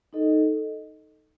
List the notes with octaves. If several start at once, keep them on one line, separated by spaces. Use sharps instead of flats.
D#4 A4 D#5